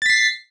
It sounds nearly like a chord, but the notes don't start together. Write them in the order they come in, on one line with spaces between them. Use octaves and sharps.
A6 B6 C7